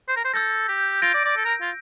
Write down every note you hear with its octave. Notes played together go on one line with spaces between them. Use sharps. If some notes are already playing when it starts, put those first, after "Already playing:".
C5
A#4
C5
A4 E6 G6 A#6
G4
F4 G6 A#6 D7
D5
D5
A4
A#4
F4